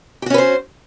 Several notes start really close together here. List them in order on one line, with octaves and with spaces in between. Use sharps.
G4 F#4 C#4 B4 C5